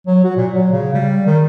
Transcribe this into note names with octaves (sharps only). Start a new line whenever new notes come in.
F#3
F#4
A#2
F#3
C#3
G3
D#3